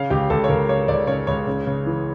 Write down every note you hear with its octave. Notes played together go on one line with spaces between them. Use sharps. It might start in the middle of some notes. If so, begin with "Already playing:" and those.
Already playing: C#3 F5
C#2 G4
C#2 A4
C#5
C#2 A#4
C#3 C#5
C#2 D5
C#3 C#5
C#2 C#5
C#3
C#3
E3